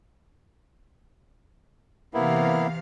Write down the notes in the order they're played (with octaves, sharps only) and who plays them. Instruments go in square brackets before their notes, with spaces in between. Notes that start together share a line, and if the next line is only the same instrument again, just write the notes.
[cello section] C3 E3 F5 [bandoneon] A#3 B3 E4